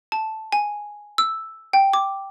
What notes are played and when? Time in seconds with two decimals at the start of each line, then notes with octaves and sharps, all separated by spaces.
0.12 A5
0.52 G#5
1.18 E6
1.73 G5
1.93 D6